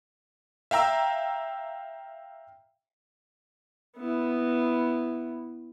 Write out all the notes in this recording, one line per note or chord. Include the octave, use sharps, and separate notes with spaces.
E5 F5 G5 A#5 E6
B3 E4